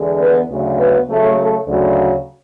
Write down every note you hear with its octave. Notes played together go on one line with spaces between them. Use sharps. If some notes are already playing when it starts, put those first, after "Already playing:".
Already playing: E2 D3 G#3
B3 B4
D2 C#3 F#3
B3 B4
C#3 F#3 A3
A3 A4
D2 C#3 F#3